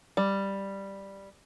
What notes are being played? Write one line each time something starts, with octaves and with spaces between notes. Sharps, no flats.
G3